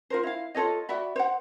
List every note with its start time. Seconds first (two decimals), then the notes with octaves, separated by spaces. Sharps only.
0.10 F4 A#4 C5
0.23 E4 F5
0.55 F4 A4 C#5 D#5
0.89 F#4 D5 E5 B5
1.16 C5 F#5